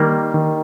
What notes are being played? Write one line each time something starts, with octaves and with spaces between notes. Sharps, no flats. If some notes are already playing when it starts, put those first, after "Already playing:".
Already playing: D#3 G3 A#3
D#3